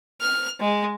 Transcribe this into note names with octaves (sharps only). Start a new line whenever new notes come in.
F6
G#3